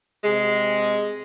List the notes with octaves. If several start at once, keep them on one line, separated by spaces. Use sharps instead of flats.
C3 G#3